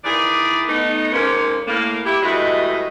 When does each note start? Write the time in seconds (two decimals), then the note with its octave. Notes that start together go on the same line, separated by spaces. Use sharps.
0.04 D#3 E3 A#3 G#4 D5
0.68 A3 B3 D#4
1.13 F2 G#2 A#3 C#4
1.67 A2 A#3
2.05 E4 G4
2.22 G2 E3 G#3 A3 F#4 D#5